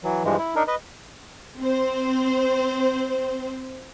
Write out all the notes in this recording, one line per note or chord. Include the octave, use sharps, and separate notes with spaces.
E3 F#3
G2 E3 F3 G#3
E4
D4 D#4 A#4
B4 D#5
C4 C5